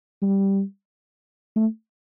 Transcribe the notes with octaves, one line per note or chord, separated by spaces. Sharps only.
G3
A3